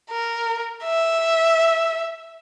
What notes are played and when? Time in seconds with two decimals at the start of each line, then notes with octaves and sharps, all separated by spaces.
0.10 A#4
0.85 E5